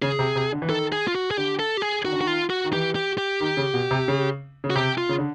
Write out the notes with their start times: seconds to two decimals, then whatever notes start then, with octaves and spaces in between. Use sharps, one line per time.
0.02 C#3 G#4
0.19 C3
0.36 C3
0.52 D3
0.62 E3
0.69 D#3 A4
0.92 G#4
1.08 F4
1.15 F#4
1.31 G#4
1.37 D3 G4
1.59 A4
1.77 G4
1.82 G#4
2.05 D#3 F#4
2.12 D3
2.20 D#3 F#4
2.27 F4
2.50 F#4
2.64 D#3
2.72 E3 G4
2.95 G4
3.18 G4
3.41 D#3
3.57 C#3
3.74 B2
3.91 C3
4.08 C#3
4.64 C#3
4.70 F#4
4.75 C3 G4
4.98 F4
5.09 C#3
5.18 D3